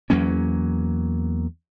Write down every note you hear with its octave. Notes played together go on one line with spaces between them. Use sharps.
E2 F#3 A#3 C#4